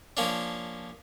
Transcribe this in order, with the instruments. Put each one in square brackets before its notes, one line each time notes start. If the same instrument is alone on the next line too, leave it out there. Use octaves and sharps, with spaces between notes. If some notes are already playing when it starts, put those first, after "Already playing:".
[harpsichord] F3 A#3 C#4 D4